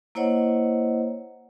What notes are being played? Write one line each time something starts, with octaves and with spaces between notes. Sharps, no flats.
A#3 E4 C5 C#5 D#5 F#5